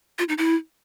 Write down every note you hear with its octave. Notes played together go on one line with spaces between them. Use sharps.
F4
D#4
E4